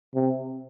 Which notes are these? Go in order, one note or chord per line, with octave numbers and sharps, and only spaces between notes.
C3